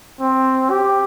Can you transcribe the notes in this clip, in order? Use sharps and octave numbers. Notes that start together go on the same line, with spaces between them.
C4
G4